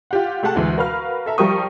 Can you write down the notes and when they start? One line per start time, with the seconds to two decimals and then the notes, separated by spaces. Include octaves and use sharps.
0.11 F4 G4 F#5
0.43 A3 G4 G#4 F#5 A5
0.55 D2 E3 G#3
0.77 F#4 A#4 B4 F5 F6
1.26 A4 E5 A#5
1.38 F3 G3 A#4 G5 C#6 D#6